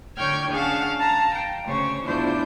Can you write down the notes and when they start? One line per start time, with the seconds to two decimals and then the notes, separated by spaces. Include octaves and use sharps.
0.17 D3 C#5 G5 F6 G6 G#6
0.50 C#4 D4 G#4 F5 F#5 A5
0.99 F5 A5 A#5
1.35 G5
1.66 D2 C#3 C5 C#5 C#6
2.05 E2 D4 E4 F4 C5 G6